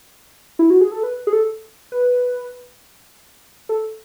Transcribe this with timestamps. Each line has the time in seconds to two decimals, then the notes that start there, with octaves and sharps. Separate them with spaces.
0.59 E4
0.70 F#4
0.81 G#4
0.92 A4
1.03 B4
1.27 G#4
1.33 A4
1.92 B4
3.69 A4